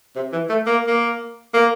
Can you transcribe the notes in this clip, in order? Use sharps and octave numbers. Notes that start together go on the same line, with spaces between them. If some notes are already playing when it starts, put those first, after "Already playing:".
C3
E3
A3
A#3
A#3
A#3